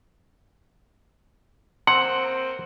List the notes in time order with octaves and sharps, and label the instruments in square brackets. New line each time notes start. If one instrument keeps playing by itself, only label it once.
[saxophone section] A#3 C4 [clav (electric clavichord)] F#5 [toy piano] C6